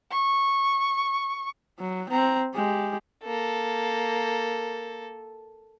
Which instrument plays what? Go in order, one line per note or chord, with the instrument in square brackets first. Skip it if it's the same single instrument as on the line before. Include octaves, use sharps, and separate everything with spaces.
[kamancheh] C#6
[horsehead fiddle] F#3
C4 A#5
G#3 G4
[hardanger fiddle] A#3 A4